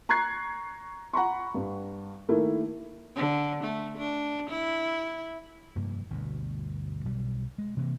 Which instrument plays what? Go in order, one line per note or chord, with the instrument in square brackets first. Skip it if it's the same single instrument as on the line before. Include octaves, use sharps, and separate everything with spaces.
[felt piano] A#5 C#6 F#6 G#6 C7
F#5 A#5 B5 C#6
G2
D#3 A3 A#3 E4
[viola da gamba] D3
A3
D4
E4
[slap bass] F1 G2 A#3
G1 D2 B2
B1 G3
G#3
C3 E3 F3 A#3